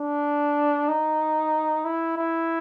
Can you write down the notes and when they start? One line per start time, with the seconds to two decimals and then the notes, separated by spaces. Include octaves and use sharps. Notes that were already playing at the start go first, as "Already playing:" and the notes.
Already playing: D4
0.88 D#4
1.85 E4
2.17 E4